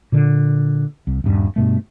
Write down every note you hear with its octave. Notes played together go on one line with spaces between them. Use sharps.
A#2 D3
C2
D#1 G2
G2 B2 A3